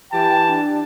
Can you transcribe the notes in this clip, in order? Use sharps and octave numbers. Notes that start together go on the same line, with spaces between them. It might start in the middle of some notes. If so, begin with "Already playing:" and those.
E3 G4 G5 A5
D4